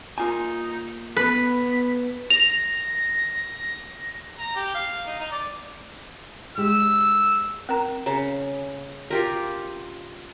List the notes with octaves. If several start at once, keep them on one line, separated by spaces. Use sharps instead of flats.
A#3 D#4 F4 G#5
B3 A4 B4 B5
A#6 F7
A#5
G4
F5
D#4
D#4
D5
G#3 G4 E6
C4 A#4 A#5
C#3 A#5
F4 G4 A#4